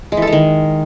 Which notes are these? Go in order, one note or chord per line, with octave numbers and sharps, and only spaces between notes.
G#3
E3
A4
G#3
D#3